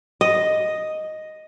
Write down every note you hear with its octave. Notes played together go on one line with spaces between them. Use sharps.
D#5